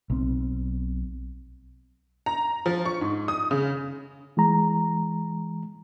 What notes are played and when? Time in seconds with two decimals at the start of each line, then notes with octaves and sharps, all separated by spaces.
0.10 B1 C4
2.26 A#5
2.66 F3
2.85 C#6
3.01 G#2
3.28 D#6
3.51 C#3
4.37 E3 G#3 A#5